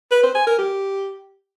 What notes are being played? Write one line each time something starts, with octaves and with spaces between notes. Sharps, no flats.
B4
C5
G#5
A#4
G4